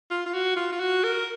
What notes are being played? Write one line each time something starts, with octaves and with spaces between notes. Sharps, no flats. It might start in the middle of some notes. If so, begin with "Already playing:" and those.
F4
F4
F#4
F4
F4
F#4
A#4